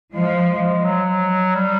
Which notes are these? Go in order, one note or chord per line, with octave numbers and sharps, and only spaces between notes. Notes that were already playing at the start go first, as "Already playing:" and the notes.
F3 G#3
F#3
G3